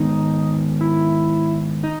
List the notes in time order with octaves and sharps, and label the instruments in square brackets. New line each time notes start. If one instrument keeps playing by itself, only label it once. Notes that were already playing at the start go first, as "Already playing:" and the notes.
Already playing: [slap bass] G#2 D#3 G#3 B3 [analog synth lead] D#4
[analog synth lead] E4
D#4